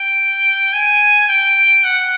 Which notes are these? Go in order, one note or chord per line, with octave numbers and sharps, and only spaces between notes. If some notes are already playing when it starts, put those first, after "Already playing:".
Already playing: G5
G#5
G5
F#5